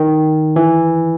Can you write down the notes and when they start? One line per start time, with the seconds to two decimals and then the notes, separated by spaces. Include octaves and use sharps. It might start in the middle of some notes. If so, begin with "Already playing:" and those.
Already playing: D#3
0.56 E3